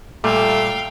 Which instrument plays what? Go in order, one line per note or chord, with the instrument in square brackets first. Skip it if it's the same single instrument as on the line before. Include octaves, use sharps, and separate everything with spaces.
[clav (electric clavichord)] A#2 G3 [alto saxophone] A3 [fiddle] F5 G5